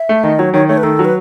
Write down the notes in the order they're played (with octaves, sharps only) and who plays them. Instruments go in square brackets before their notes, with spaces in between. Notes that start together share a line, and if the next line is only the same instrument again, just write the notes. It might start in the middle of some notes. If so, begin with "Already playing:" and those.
Already playing: [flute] E5
[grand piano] A3
[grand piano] D#3 [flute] D#5
[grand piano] F#3 [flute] C#5
[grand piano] D#3 [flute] C#5
[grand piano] A3 [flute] C#5
[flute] B4
[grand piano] D#3 [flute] A4
[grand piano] F#3
[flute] B4